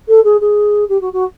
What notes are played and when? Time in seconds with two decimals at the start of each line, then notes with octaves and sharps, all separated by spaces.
0.08 A4
0.24 G#4
0.40 G#4
0.89 G4
1.01 F#4
1.13 F#4